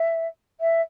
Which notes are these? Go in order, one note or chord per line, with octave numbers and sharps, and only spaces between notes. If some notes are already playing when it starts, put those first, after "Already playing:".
Already playing: E5
E5